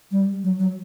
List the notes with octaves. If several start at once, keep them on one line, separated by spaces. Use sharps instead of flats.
G3
F#3
F#3